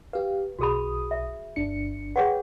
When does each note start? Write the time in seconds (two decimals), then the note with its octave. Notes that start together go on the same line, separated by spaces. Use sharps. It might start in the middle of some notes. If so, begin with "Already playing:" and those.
0.13 G4 B4 F5
0.59 B1 F#4 G#4 B5 D#6
1.11 E5
1.56 G1 D4 C#7
2.16 G#4 B4 C#5 F#5 G5